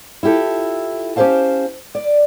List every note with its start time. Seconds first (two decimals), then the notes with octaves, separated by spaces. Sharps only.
0.23 E4 F4 G4 A4
1.16 C#4 G4 G#4 C5 F5 A5
1.95 D5